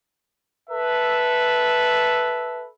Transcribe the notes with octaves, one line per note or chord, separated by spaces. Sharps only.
A4 B4 E5